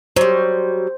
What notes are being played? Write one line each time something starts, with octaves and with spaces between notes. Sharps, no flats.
F#3 G3 C5